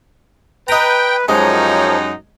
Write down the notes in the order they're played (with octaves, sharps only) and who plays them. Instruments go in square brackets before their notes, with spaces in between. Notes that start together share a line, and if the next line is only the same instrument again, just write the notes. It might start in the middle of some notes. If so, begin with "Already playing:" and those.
[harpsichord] D#4 A#5 [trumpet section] B4 [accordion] G5
[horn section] F#2 D#4 [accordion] F3 [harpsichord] G#3 [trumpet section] G4 C#5